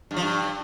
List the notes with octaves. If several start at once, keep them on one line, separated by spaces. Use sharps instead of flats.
G2
F3
G2